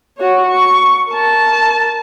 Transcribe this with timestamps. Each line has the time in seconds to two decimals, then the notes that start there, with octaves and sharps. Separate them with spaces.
0.18 F#4 C#5
0.49 C#6
1.10 A#4 A5